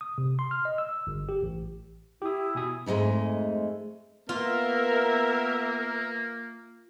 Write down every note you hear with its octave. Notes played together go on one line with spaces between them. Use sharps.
D#6
C3
C6
F6
D#5
E6
G1
G4
A1
E4 G4 D#6
B2 G#5 D#6
F2 G#2 F#3 G#3 A3
A#3 B3 F4 A#4 E5